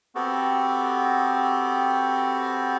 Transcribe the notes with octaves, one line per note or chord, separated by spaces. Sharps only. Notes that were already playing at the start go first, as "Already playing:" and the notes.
B3 C4 F#4 G4 A4